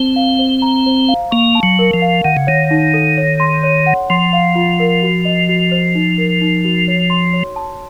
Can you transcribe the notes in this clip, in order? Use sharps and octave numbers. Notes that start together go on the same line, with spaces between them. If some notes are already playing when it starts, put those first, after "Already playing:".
Already playing: C4 C5 A5
F5
C5
A#5
C5
F5
A#3 C#6
A5
F#3
A#4
F3
F5
D#3 F#5
C#3
D#3 C#5
D#4
A4
C#5
C6
C#5
F#5
F3 C6
F5
F4
A#4
F#4
D#5
F#4
C5
D#4
A#4
D#4
F#4
C#5
C6
C#5
A5